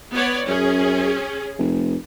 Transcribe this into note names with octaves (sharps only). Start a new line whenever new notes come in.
B3 C#5 D5
F#2 C#4 G#4
F1